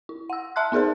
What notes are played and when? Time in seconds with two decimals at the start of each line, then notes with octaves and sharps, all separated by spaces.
0.09 E4
0.30 F#5 E6
0.56 E5 A5 C6 F6 F#6
0.72 B3 D#4 G#4 A#4 C5